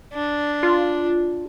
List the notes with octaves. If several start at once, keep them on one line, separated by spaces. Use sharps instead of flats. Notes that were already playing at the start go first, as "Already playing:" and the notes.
D4
F4